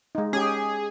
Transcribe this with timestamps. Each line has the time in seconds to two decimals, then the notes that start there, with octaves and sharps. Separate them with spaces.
0.15 G#3 D#4
0.33 C#4 G4 G#4